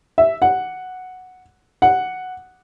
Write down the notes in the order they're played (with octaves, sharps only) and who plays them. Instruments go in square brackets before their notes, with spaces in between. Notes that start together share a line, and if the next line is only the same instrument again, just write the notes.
[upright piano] E5
F#5
F#5